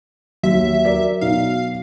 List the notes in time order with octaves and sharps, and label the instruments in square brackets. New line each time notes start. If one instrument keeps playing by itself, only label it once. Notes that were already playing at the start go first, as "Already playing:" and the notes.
[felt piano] D#2 [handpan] F#3 [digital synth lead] E5
[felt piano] A#4 D5
[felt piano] B2 D#4 [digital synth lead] F5